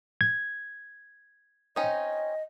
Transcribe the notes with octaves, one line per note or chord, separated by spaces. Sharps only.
G#6
C4 C#4 D#4 D#5